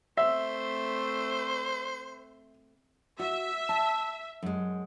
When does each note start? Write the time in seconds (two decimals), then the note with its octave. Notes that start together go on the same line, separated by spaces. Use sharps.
0.17 A3 C4 C5 E5
3.19 F#4 E5
3.69 A5
4.43 F#2 G#3